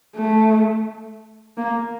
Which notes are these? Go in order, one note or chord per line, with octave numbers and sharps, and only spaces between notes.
A3
A#3